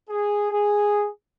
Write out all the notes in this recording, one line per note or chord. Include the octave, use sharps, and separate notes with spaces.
G#4
G#4